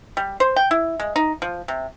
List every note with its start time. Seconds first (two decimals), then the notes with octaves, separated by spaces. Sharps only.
0.17 G3
0.40 C5
0.56 G5
0.71 E4
1.00 G#3
1.16 D#4
1.42 F3
1.68 C3